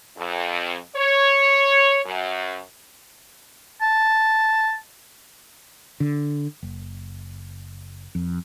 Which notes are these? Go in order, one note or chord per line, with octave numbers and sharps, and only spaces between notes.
F2
C#5
F#2
A5
D3
F#1
F2